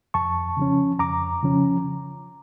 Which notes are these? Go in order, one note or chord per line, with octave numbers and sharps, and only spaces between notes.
F2 A5 C#6
C#3 F3 C#4
F2 A#5 D6
C#3 F3 C#4